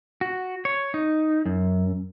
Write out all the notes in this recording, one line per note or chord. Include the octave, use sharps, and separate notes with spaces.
F#4
C#5
D#4
F#2